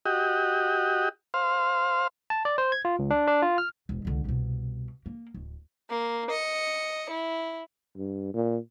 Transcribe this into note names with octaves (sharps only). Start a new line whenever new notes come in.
F#4 G4 D#5
C5 F5
A5
D5
C5
G#6
F4
C#2
D4
D4
F4
F6
E1
C#2 D3
C2 B2
A#3
D1
A#3
D#5 C#7
E4
G2
A#2